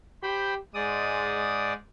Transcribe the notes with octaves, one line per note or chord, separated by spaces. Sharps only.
G4 C5 G5 B5
G#2 G#3 D5 D#6